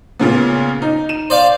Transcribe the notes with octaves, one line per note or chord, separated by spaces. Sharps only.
A#2 C#3 B3
D#4
D#7 E7
C5 D5 F5